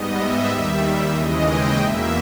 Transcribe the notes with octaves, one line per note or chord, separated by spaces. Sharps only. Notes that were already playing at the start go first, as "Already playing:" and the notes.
Already playing: G#2 G3 B3 D#5
E5
D#2 D#3 G3
E5
D#2 C#3 E3 G#3 D#5
G5
E2 B2 A#3 E5